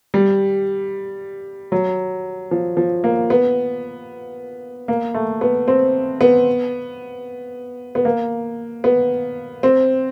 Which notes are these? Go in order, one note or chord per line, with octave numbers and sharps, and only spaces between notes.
G3
F#3
F3
F3
A#3
B3
A#3
A3
B3
C4
B3
B3
A#3
B3
C4